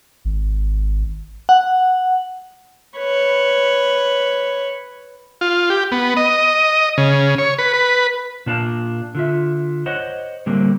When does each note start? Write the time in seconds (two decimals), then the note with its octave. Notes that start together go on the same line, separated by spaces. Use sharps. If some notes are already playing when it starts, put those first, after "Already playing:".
0.25 G#1
1.49 F#5
2.98 B4 C#5
5.41 F4
5.70 G4
5.92 B3
6.17 D#5
6.98 C#3
7.38 C#5
7.58 B4
7.74 B4
8.46 A#2 D4 F5 A5
9.15 D3 F4 E5
9.86 C5 C#5 D#5 F#5
10.46 A2 D3 G3 A#3 C4